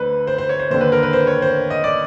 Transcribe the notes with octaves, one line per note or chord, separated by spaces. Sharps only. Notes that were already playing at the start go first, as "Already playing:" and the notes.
Already playing: D2 D3 B4 C5
C5
C5
C#5
C5
D#2 D3 C5
B4
A#4
B4
C5
C#5
C5
D#5
D5